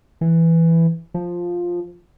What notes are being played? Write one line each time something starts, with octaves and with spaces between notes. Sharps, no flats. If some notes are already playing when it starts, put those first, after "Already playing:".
E3
F3